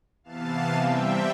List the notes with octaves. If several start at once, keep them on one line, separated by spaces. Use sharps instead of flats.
C3 E3 B3 F5 A5
C3 G3 C4 E5 G5